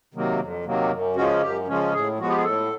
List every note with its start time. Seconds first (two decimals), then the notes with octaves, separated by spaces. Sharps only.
0.14 C3 D#3 F#3 A#3
0.39 F2
0.65 C3 D#3 F#3 A#3
0.91 F#2
1.16 C#3 F3 G#3 C#4 F#4
1.42 F#2 G4
1.67 C#3 F3 G#3 C#4
1.93 A2 G#4
2.19 F3 G#3 B3 F#4
2.29 G4
2.37 G#4
2.44 A2 A4